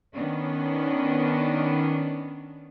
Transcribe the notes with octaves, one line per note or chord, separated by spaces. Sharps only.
D#3 B3 C#4 D4